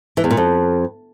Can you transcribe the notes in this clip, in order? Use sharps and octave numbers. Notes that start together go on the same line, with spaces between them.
E3
E2
A#2
F2